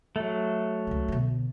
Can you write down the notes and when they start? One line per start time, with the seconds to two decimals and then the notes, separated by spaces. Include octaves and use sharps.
0.16 F#3 A3
0.87 C#2 D3
1.08 B2 D3